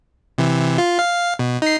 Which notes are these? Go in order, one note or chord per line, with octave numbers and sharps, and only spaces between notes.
C3 E3
F4
F5
B2
D#4 C7